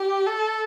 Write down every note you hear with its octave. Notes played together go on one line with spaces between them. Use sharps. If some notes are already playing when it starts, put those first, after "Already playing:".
Already playing: G4
A4